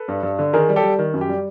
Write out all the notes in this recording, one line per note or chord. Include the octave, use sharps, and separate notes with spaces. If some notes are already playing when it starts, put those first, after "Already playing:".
Already playing: A4 B4
G2
G2
D3
D#3 G#4 A#4
G3
G4 A4
G3
D#3
F#2
G4
G3